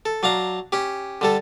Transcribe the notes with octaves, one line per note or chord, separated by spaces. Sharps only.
A4
F#3 D4 F5 A#5
C#4 G4
D3 G3 A4